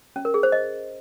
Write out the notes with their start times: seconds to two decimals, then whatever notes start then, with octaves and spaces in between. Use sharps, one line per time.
0.16 C#4
0.25 A#4
0.34 G#4
0.43 C5
0.52 D#5